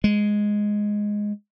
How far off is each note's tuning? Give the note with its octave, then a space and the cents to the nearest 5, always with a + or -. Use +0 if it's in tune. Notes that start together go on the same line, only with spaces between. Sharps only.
G#3 +0